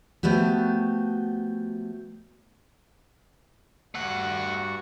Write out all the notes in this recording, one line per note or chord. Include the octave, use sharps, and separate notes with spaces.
F3 A3 B3 F#4 G4
G2 A3 F#4 F#5 C#6